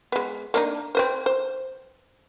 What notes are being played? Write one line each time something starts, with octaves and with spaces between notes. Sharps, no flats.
G#3 B3
A#3 D4 D#4
C4 B4 C5
C5